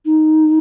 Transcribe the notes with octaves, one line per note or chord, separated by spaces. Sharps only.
D#4